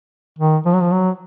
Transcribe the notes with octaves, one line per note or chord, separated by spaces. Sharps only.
D#3
F3
F#3
F3
F#3